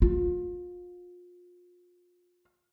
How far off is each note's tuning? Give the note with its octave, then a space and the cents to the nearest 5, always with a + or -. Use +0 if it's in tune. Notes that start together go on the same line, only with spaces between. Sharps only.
F4 +30